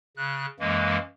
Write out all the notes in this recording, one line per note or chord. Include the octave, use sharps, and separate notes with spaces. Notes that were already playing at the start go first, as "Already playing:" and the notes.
C#3 F#6
F#2 E3 G#3 A#3